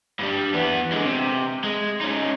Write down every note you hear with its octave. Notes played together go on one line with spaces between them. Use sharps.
G2 G3
E2 B3
D3 G#3
C3
G#3
C#4 D#4